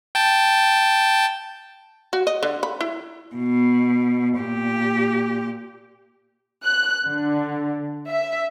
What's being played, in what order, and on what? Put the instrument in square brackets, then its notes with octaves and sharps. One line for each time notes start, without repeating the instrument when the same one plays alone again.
[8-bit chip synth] G5 A5
[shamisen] F#4
D#5
D3
B5
E4
[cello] B2
A#2 G4
[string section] F#6
D3
E5